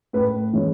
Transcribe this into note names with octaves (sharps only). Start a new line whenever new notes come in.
A2 B4
E3 G#3 C#4